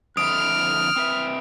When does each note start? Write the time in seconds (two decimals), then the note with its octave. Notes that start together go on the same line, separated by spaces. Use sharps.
0.17 F2 D3 E4 D#6 F6 D7
0.96 C4 B4 E5